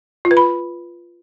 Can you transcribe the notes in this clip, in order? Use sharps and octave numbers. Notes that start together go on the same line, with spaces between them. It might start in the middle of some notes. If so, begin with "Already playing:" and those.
F4
B4
B5